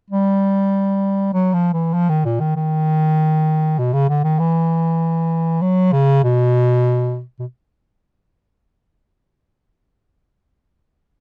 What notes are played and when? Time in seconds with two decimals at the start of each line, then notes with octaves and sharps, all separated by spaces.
0.11 G3
1.33 F#3
1.54 F3
1.73 E3
1.94 F3
2.09 D#3
2.25 A#2
2.41 D#3
2.56 D#3
3.79 B2
3.94 C#3
4.09 D3
4.24 D#3
4.39 E3
5.62 F#3
5.93 C#3
6.24 B2
7.40 B2